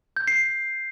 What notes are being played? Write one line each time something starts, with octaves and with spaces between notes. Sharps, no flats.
G6
C7
C7